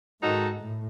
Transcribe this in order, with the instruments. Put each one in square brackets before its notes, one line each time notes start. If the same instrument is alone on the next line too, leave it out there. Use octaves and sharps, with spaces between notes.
[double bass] G#2 [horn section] D#3 G#3 D#4 F#4 A4
[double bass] A2